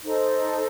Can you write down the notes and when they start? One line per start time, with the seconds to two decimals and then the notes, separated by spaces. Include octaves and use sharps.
0.03 D#4 A4 C5